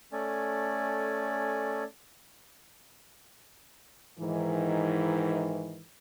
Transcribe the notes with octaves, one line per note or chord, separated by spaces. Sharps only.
A3 C#4 A4 D5 G#5
G#2 D#3 E3